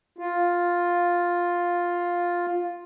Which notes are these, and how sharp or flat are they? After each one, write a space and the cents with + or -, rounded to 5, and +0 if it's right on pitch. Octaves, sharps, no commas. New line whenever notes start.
F4 +5